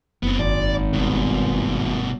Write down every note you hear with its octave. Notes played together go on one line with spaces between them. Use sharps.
F#1 B3 C4
G#1 D5
G2 B2